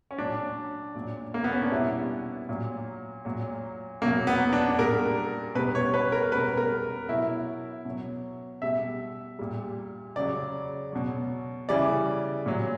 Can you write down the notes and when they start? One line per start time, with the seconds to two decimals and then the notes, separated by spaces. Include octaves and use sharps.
0.11 C#4
0.18 A#2 F#3 D4
0.95 A#2 F#3
1.34 A#3
1.44 B3
1.53 C#4
1.63 D4
1.72 B2 G3 E4
2.49 A#2 F#3
3.25 A#2 F#3
4.02 B2 F#3 A#3
4.27 B3
4.53 D4
4.78 A#2 G3 A#4
5.55 B2 B4
5.58 G3
5.75 C#5
5.94 B4
6.12 A#4
6.32 G3 B4
6.35 B2
6.57 A#4
7.08 B2 F#3 E4
7.85 B2 F#3
8.62 B2 G3 E5
9.39 A#2 G3
10.16 C#3 F#3 D5
10.92 B2 F#3
11.69 C#3 E3 G3 D5
12.46 A#2 F#3